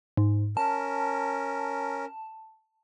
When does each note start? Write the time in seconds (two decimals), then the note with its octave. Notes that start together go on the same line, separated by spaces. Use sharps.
0.17 G#2
0.57 C#4 A#4 A5